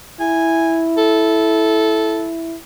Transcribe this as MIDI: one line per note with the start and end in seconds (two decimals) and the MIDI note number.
0.20 2.56 64
0.20 0.82 80
0.97 2.31 69